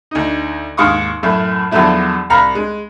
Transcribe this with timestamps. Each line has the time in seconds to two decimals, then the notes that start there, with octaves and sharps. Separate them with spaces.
0.11 D2 D#4
0.77 D#2 G#2 F5 C#6 D#6
1.23 F#2 A2 A3
1.71 E2 D3 F3 F#3 A3 E4
2.30 C2 F5 A#5 B5
2.55 G#3